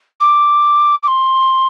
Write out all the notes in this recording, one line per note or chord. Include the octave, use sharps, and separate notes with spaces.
D6
D6
C6